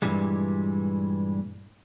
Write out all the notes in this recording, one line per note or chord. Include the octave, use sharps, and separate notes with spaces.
G2 A#2 E3 G3 G#3